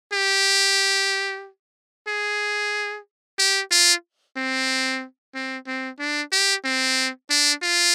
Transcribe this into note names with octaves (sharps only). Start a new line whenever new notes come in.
G4
G#4
G4
F4
C4
C4
C4
D4
G4
C4
D4
F4